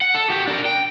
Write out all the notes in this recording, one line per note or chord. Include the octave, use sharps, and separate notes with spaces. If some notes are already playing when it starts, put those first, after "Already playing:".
F#5
A4
F#4 G4
D4 A#4
G5